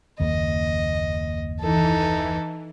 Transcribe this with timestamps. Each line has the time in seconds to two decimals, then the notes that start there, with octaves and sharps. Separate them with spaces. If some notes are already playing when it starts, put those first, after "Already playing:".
0.20 F#1 D#2 A#3 D#5
1.60 E3 D#4 A4